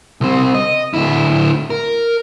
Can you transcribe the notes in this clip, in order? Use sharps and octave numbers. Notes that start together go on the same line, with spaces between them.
C2 C4
D#5
D2 E4
A#4